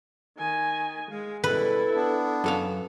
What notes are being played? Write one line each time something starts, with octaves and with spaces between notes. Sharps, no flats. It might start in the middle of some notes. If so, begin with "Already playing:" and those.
D#3 G#5
G#3 F5
B2 G3 E4 A4 B4
B3 D4
F#2 A4 F5